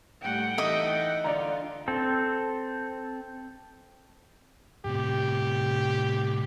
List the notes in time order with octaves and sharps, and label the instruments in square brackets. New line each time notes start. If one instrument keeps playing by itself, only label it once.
[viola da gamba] A2 G3 A3 [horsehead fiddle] F#5 G5
[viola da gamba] E3 D#4 A4 [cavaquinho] D#5 E5
[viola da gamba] D3 [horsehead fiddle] F4 [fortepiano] D5 A#5
[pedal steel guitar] C4 A4
[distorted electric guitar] A2 C3 [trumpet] G4